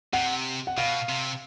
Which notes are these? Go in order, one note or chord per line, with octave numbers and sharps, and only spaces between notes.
C3 F#5
F#5
B2 F5
C3